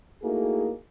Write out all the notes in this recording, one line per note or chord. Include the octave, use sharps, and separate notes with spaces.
A3 A#3 D#4 E4 F#4 G#4